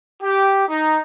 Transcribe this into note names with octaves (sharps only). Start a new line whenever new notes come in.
G4
D#4